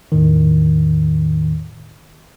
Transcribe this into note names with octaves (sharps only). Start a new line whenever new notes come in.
E2 A2 D#3